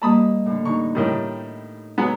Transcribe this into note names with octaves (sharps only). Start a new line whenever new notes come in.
G3 A#3 D#5 A5 B5 D#6
A2 D3
D3 E3 D#4 C#6
A2 D#3 G3 G5 D#6
F#3 G#3 B3